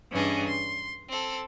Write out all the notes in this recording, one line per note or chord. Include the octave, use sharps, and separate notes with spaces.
G2 E3 C#4 D4 G#4 D#5
C6
C4 A4